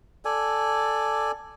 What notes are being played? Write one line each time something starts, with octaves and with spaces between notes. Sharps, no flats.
A4 D5 G#5